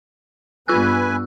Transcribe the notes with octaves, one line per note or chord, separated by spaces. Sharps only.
G2 B3 F4 B4 G#5 E6 F#6